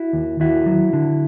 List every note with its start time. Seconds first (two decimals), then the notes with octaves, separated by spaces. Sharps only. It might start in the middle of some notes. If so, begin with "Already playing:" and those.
Already playing: E4 F#4
0.13 D#2
0.40 D#2 E4 F#4
0.66 F#3
0.93 D3